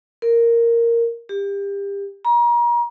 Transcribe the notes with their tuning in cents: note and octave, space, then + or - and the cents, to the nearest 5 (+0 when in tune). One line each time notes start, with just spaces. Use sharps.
A#4 -5
G4 +30
A#5 +35